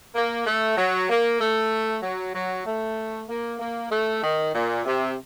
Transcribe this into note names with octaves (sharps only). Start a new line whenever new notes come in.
A#3
A3
F#3
A#3
A3
F#3
F#3
A3
A#3
A#3
A3
D#3
A#2
C3